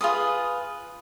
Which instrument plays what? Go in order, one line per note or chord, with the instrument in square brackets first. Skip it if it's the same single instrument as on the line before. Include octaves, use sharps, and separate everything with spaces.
[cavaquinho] F4 G#4 B4 D#6